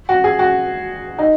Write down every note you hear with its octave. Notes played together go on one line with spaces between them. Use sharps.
F#4
G#4
F#4
D#4